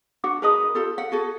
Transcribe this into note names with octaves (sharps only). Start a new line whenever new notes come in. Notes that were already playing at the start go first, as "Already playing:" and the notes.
D4 F#4 F#5 D6
G#4 A#4 B4 D#5 A5 D#6
F4 G4 A4
F5 F#5
F#4 G#4 A4